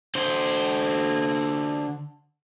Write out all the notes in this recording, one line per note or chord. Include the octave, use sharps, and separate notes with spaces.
D3 C5